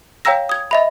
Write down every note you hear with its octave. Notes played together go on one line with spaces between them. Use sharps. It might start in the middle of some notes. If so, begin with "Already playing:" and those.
C#5 F5 G5 A#5 E6 A#6
D#6 G#6
D#5 E5 B5